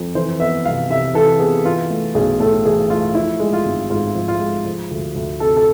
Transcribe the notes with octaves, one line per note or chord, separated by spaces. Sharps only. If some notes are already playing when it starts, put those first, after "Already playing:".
Already playing: F2
E3 C5
B3 E5
C2 F5
C3 E5
E3 A4
B3 G#4
E3 F4
A3
B1 G#4
A2 A4
E3 G#4
A3 F4
F3 E4
G#3
F4
G#1
G#2 F4
F3
F4
G#3
F3
D2
D2
C3 A4
A4